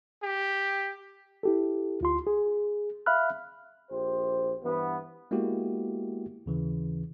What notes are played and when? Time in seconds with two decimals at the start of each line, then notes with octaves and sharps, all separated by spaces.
0.22 G4
1.43 E4 G4 A4
2.01 D2 F4 C6
2.27 G#4
3.06 E5 F5 B5 F6 F#6
3.90 A#1 G4 C5
4.64 G2 E3 B3
5.31 G#3 A#3 B3 E4 F#4 G4
6.46 D#2 C#3 E3